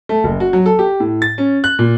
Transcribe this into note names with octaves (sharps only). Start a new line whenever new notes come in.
A3
F#1
F#4
F#3
A4
G4
A2
A6
C#4
F#6
A#2